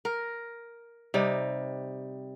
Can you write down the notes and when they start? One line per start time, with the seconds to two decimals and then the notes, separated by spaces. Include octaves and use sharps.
0.05 A#4
1.14 C3 G3 D#4